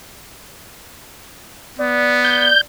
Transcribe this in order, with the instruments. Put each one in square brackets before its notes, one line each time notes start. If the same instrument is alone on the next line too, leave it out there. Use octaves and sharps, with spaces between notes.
[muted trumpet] B3 [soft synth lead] D5
[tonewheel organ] G6